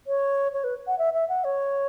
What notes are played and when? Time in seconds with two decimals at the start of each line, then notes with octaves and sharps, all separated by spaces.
0.07 C#5
0.53 C#5
0.64 B4
0.87 F#5
0.99 E5
1.14 E5
1.29 F#5
1.44 C#5